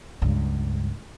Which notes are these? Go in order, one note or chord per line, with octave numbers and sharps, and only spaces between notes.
C#2 G2